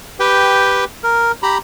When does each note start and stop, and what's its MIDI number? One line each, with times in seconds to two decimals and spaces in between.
0.20 0.84 67
0.20 0.84 71
0.20 0.84 79
1.03 1.32 70
1.43 1.58 67
1.43 1.58 82
1.43 1.58 83